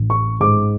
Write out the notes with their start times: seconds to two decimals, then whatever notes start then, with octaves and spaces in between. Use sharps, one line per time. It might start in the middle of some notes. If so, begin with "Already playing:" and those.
Already playing: A1
0.10 C#6
0.40 G#2 D6